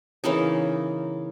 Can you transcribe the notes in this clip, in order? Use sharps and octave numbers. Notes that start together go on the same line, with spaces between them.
C#3 E3 A#3 D#4